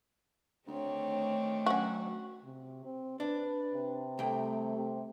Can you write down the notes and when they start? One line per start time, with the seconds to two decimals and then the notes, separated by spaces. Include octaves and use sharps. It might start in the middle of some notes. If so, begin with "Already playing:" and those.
0.67 D2 D#3 A3 C4 D4 C#5
1.66 F#3 C#4 F#4
2.44 C3
2.85 C4
3.20 D4 B4
3.74 C3
4.19 C2 A3 G5
4.76 C3